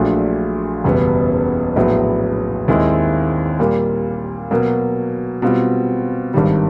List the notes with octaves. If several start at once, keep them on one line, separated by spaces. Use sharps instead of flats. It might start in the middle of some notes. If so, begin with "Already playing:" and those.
Already playing: A#1 A#2 F#3 A3 D4
F#1 E2 B2 G3 B3
A#1 A2 F#3 B3
D#2 D#3 G#3 C4 E4
A#2 G3 A#3
B2 F#3 A#3
B2 G3 C4 F4
G#1 G2 D#3 G3